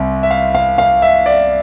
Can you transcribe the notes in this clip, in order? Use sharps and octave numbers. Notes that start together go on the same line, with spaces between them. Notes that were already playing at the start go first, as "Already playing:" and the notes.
Already playing: C2 C4
E5
F5
F5
F5
E5
D5